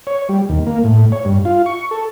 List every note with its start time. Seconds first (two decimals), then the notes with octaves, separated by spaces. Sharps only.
0.07 C#5
0.29 G3
0.49 D#2
0.66 A#3
0.84 A2
1.12 C#5
1.25 G2
1.45 F4
1.66 C#6
1.91 A4